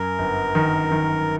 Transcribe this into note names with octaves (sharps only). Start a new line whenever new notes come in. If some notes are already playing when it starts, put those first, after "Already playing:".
Already playing: F#2 A#4
G1
D#3
D#3